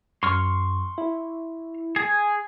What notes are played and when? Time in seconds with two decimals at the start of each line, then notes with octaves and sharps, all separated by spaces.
0.23 F#2 C6 C#6 F6
0.98 E4
1.96 G#4 G#5